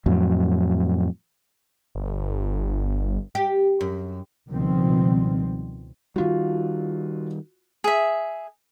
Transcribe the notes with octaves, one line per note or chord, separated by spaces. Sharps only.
F2 A2 F#3
G1
G4
F#2
C#2 B2 D#3 F3 G3 C4
D#3 G3 F4 F#4
G#4 E5